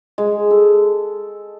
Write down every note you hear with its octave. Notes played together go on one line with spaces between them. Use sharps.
G#3
A4